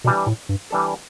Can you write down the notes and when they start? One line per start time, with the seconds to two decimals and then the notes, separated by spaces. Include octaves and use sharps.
0.04 B2 E3 G3 D4 A4
0.26 A2
0.49 G2
0.71 E3 G3 D4 A4